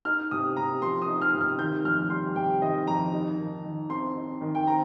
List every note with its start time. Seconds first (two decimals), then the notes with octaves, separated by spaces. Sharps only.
0.05 D#4 F6
0.31 C3 D#6
0.56 C3 A#5
0.82 F3 C6
1.02 D#6
1.08 D#4
1.22 F6
1.33 C3
1.41 F6
1.59 D#3 G6
1.84 F2 F6
2.10 G3 C6
2.36 C3 G5
2.62 D#3 D#5
2.87 F2 A#5
3.13 D#4
3.38 D#3
3.65 D#3
3.89 C4 C6
4.16 D#4
4.41 D#3
4.55 G5
4.66 C4 A#5